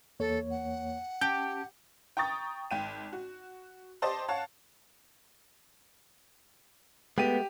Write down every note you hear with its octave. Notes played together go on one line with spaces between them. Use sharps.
E2 A#3 A4 C#5
F#5
C#4 G4 A5 G6
G5 A#5 C#6 D#6 A6
G#1 G5 D#7
F#4
G4 C5 D5 D#5 A5 C6
C#5 F5 F#5 A5
G#3 A3 B3 G4 D#7